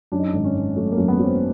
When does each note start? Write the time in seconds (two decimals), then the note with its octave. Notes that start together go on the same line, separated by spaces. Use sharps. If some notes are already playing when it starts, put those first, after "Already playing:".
0.12 F#2 D4
0.20 D#4
0.28 D4
0.33 G#1
0.44 C#4
0.55 G#1
0.76 F#3 A3
0.92 A#3
0.98 F#2
1.08 B3
1.19 F#3
1.24 C4